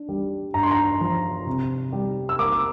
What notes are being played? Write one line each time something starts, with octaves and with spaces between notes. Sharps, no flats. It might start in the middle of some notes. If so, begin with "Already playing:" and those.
Already playing: D4
G3
G2 A#5
C6
A#5
F3
C3
G3
E6
A#3 D6